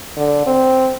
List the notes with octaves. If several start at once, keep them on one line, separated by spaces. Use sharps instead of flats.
D3
C4